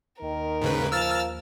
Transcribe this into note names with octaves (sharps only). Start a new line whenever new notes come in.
D#2 D#3 A#4
G#2 C#3 B4
F3 E6 F6 A6